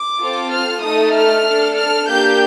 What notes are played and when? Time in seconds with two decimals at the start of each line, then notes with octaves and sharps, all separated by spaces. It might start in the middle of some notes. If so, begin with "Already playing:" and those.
Already playing: D6
0.21 C4 F4 A4
0.53 F6
0.83 A3 D#4 A4 D#6
1.15 F6
1.46 D4 A4
1.77 F6
2.09 A#3 D4 G4 G6